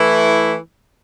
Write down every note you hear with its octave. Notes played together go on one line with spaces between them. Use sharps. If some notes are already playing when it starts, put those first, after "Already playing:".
Already playing: E3 A3 E4